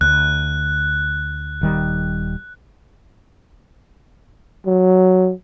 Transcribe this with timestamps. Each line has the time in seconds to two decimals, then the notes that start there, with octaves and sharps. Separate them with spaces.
0.01 D2 F#6
1.61 D#1 D#3 G3
4.66 F#3